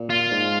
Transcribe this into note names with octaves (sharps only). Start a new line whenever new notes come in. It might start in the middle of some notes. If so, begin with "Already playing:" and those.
Already playing: A#2
F4
G#2